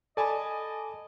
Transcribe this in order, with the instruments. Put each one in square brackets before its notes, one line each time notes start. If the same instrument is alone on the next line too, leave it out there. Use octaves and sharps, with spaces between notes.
[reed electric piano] A4 B5 [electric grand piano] D5 G#5 A5 [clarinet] D#5